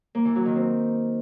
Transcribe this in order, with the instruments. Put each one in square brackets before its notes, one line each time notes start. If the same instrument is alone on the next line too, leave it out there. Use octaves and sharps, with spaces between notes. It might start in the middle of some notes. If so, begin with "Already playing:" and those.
[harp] A#3
E3
F#3
D#3
C4